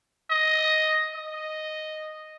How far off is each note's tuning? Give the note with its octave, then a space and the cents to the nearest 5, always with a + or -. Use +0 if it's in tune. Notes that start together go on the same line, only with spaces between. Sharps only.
D#5 +5
D#5 -5